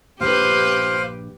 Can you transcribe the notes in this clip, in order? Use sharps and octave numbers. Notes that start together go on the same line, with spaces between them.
A#1 G2 G4 B4 C5 F5